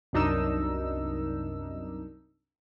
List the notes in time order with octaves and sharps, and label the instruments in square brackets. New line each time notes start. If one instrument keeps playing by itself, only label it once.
[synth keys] C2 F#2 D4 D#4 A#4 E6